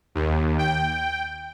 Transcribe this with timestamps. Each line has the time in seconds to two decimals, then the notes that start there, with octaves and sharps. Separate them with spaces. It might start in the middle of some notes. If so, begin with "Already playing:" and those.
0.15 D#2
0.59 G5